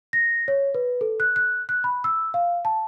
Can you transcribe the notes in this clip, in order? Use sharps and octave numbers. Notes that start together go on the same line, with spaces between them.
A#6
C#5
B4
A4
F#6
F#6
F#6
B5
E6
F5
A5